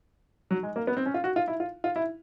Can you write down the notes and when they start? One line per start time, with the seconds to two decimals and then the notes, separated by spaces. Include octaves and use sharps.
0.51 F#3
0.63 G#3
0.76 A#3
0.87 B3
0.97 C4
1.06 C#4
1.14 F4
1.24 F#4
1.36 F4
1.48 E4
1.60 F4
1.84 F4
1.96 E4